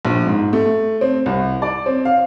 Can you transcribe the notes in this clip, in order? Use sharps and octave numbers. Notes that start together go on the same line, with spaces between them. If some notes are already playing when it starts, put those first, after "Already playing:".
A#1
G#2
A3
C4
C2
D5
C4
F5